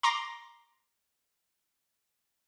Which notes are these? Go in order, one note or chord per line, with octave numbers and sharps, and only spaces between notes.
A#5 C6 D6 A#6